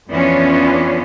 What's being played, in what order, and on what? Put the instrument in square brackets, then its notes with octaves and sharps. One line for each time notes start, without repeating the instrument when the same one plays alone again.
[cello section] F2 E3 B3 C#4 D4 F4